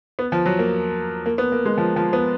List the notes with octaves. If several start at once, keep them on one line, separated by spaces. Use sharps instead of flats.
B3
F3
F#3
A#3
A#3
B3
A#3
G#3
F3
F3
B3